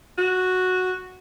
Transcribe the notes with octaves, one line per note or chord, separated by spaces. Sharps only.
F#4